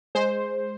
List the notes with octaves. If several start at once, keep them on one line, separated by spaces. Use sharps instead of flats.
G#3 C5